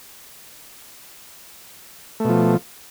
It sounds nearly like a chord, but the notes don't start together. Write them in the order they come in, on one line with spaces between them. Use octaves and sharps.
A3 B2 F3